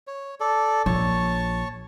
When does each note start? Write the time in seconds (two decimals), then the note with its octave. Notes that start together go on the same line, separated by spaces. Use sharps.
0.07 C#5
0.40 A4 D5
0.86 A#1 C#5 A5 C#6